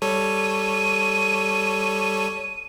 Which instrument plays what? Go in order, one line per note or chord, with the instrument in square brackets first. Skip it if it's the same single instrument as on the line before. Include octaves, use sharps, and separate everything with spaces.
[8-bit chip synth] G3 A4 C#5 [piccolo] D#7